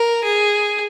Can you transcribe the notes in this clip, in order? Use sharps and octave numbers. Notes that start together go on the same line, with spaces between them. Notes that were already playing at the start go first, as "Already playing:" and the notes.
Already playing: A#4
G#4